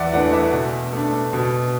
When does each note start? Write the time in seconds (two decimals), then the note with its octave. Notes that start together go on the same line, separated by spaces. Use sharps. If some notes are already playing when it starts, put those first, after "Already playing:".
Already playing: E2 D5 E5 F#5
0.13 E3 A3 D4 D5 F#5
0.33 E5
0.53 B2
0.93 A3 D4
1.33 B2